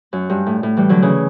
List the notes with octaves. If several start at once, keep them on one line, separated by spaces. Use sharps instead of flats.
F#2
G2
A2
A2
E3 G3
D3 F#3
C#3 E3